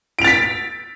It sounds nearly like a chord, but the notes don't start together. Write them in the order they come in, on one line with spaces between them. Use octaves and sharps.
D7 F7 A6 B6